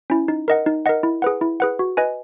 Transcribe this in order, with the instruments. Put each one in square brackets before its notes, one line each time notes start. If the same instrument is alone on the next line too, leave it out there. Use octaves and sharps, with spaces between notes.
[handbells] C#4 E4
D#4
A#4 D#5 F#5
D#4
A#4 D#5 F#5
E4
G#4 B4 F#5
E4
G#4 B4 F#5
F#4
B4 D#5 G#5